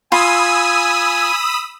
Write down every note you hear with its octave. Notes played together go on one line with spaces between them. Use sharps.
F4 G#5 B5 D#6 E6